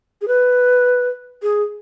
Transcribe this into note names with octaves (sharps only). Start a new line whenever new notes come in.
G#4
B4
G#4